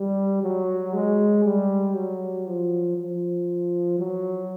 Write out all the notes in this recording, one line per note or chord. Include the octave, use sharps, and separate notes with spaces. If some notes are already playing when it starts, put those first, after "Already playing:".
Already playing: G3
F#3
G#3
G3
F#3
F3
F3
F#3